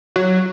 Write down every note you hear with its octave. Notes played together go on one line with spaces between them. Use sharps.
F#3